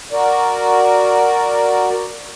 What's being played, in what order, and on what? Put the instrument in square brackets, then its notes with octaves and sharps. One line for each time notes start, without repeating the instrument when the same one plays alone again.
[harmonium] F#4 A#4 D5